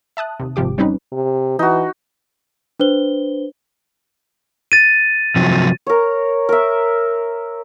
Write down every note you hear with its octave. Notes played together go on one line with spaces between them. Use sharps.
E5 A5 D#6 F#6
D#2 C3
G#1 C3 F3 G4 D6
G3 C4 C#4 D#4 B4
C3
E3 D#4 F#4
D4 B4 C5 G7
A6 D#7
C3 F3 F#3
A#4 C#5
A#4 E5